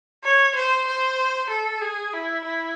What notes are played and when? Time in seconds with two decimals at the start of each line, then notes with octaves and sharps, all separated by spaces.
0.24 C#5
0.55 C5
0.87 C5
1.50 A4
1.82 G#4
2.13 E4
2.45 E4